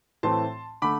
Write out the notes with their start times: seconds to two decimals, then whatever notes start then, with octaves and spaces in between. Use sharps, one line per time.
0.23 A2 E3 A3 C4 A5 C6
0.82 D3 A3 B5 D6